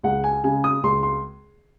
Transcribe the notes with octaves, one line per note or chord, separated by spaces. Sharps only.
C#2 F#5
G#5
C#3 G#3 G#5
D#6
C#2 C6
C6